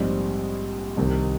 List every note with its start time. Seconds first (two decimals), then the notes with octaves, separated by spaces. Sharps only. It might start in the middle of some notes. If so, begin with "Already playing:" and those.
Already playing: A#1 G#2 G3 C4
0.97 C2 C3 D#3